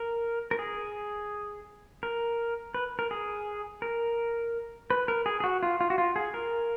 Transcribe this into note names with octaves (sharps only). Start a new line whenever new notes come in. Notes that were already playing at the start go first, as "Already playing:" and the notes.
Already playing: A#4
A#4
G#4
A#4
B4
A#4
G#4
A#4
B4
A#4
G#4
G#4
F#4
F4
F4
F#4
F4
G#4
A#4